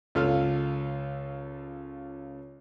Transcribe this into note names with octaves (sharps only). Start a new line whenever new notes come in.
C#2 F4 A4 F6